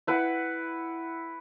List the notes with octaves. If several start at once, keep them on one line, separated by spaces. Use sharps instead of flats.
E4 B4 F#5 G5